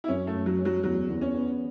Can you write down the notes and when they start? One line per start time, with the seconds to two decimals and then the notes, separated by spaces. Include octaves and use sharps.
0.04 E4
0.08 F#2 C#4
0.27 A3
0.34 F#2
0.46 F#3
0.59 C#4
0.65 F#3
0.83 E2 F#3
1.09 E2
1.21 C#4
1.34 B3